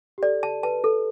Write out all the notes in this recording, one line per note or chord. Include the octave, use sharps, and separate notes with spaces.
G4
A4 D5
A5
B4 A5
A4